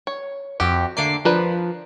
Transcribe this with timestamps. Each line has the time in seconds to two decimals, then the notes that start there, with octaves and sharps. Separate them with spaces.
0.07 C#5
0.60 F2 F#4 G4
0.97 D3 A3 A#3 D6 C7
1.25 F3 D4 A#4 B4